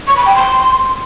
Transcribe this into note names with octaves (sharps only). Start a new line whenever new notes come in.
C#6
B5
G5
C6